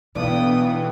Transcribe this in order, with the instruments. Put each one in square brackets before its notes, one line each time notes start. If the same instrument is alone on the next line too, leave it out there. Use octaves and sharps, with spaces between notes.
[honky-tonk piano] B1 D4 [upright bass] B2 [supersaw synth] E3 B3 [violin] G5 D#6